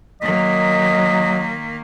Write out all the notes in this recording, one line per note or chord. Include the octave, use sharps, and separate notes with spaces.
D#3 F#3 A#3 D#5 B6